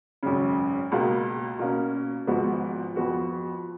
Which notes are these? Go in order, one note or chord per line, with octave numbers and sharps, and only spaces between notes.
G#1 F#2 C#3
C#2 B2 A#3
B2 A#3 C#4
G#1 G#2 F3 B3 F#4
F2 F3 B3 F#4